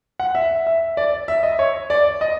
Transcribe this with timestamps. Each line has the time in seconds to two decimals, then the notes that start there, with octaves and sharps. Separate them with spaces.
0.20 F#5
0.35 E5
0.67 E5
0.97 D5
1.28 E5
1.43 D#5
1.59 C#5
1.90 D5
2.21 D#5